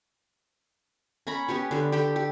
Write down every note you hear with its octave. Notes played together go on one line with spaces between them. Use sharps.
C#4 C#5 A#5 B5
B3 C#4 G4 C#5
D3 G3
G4 A4 G5
G4